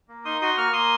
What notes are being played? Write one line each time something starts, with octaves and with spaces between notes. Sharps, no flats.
A#3
D#4 C6 D#6
F#4 C6 D#6
A#3 C#6 F6
A#3 C6 D#6